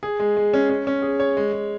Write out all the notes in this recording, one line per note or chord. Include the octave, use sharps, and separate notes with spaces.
G#4
G#3
G#3
C#4
C#4
C#4
G#4
C#5
G#3
G#3